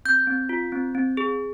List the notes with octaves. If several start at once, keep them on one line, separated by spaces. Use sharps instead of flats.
C4 G6
C4
F4
C4
C4
G#4